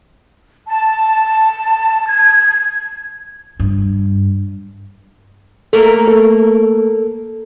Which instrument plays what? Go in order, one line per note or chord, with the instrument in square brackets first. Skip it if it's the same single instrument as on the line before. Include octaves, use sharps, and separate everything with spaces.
[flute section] A5
G#6
[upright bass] G2
[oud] A3 A#3 A#4 [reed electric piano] A4
[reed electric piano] A4